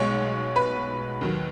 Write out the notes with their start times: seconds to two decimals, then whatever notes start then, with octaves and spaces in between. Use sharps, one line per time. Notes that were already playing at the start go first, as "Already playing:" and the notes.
Already playing: B1 B2 G#3 C#5 C#6
0.56 B4 B5
1.21 D#2 D#3 F#3